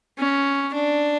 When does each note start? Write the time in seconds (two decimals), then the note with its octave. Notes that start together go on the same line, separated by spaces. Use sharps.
0.18 C#4
0.75 D4